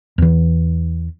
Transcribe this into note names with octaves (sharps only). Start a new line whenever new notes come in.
E2 E3